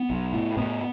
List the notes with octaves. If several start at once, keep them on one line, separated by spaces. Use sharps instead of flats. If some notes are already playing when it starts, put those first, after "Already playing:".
Already playing: B3
B1
A2
A2 B3